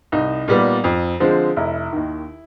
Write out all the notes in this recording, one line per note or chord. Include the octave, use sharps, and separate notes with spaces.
C2 D#4
A#2 G3 B3
F2
D3 F3 G#3 C4
F1 E4
D#2 D#3